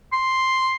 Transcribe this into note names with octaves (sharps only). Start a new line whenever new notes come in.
C6